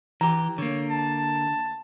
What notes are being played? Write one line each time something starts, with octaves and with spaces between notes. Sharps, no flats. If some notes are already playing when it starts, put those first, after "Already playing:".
E3 G4 A#5
D3 A#3 C#5
A5